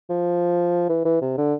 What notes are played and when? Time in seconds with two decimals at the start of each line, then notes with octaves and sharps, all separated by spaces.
0.10 F3
0.89 E3
1.05 E3
1.21 C3
1.37 D3